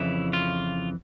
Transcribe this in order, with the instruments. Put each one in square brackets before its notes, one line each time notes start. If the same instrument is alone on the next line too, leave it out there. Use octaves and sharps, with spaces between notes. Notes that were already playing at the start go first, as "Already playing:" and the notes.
Already playing: [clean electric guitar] F2 C#3 E3 E4
F4